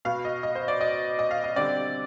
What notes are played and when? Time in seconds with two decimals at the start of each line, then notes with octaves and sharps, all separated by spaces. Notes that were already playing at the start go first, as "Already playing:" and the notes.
0.05 B2 B3 F5
0.25 D#5
0.43 D#5
0.55 C5
0.68 D5
0.81 D#5
1.19 D#5
1.31 F5
1.44 D#5
1.56 D3 G3 C4 D5